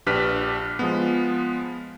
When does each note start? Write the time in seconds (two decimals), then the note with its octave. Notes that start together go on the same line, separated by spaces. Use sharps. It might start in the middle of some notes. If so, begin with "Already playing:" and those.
0.06 A#1 D4 G4 B4 F6 B6
0.79 F3 G#3 B3